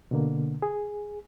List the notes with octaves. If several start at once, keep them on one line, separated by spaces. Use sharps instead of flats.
B2 D3 A#3
G#4